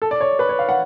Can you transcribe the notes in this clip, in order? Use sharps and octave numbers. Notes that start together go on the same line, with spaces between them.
A4
D5
C#5
B4
C#5
F5
F#5